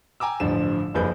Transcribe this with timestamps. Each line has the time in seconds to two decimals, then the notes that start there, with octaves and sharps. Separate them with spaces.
0.20 G5 G#5 A#5 D6 E6
0.40 A1 G2 D3 F3 E7
0.94 F#1 G2 F3 G#4 B4 G6